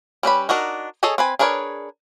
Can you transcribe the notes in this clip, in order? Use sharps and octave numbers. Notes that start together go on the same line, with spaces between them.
G3 C#4 B4 B5
D4 D#4 F#4 A#4
G#4 A4 C#5 D#5 G#5
C4 B4 G#5
D4 G#4 A#4 B4 C#5